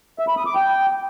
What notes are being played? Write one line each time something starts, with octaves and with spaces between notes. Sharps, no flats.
E5
B5
D#6
D6
G5